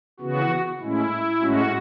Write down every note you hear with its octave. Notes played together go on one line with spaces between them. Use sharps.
C#3 E3 B3 F#4
A2 G#3 C#4 E4
A2 G#3 C#4 F#4